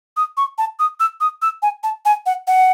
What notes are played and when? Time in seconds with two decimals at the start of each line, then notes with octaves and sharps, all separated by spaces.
0.17 D#6
0.37 C#6
0.58 A5
0.79 D#6
1.00 E6
1.21 D#6
1.42 E6
1.62 G#5
1.83 A5
2.05 G#5
2.26 F#5
2.47 F#5